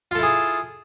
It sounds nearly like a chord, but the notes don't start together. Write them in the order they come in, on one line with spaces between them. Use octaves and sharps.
F4 A4 E4 G#4